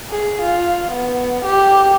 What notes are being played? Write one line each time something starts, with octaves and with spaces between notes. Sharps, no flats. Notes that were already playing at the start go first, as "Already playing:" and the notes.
G#4
F4
B3
G4